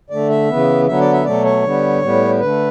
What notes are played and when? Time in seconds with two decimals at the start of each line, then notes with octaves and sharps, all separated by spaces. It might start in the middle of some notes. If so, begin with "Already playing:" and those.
0.10 D3 A3 D5
0.30 E5
0.49 C#3 E3 B3
0.87 D3 F#3 B3 E5
1.00 D5
1.13 E5
1.25 B2 F#3 A3 D5
1.45 C#5
1.64 D3 G3 B3
2.02 A2 G3 B3
2.40 D3 A3 B4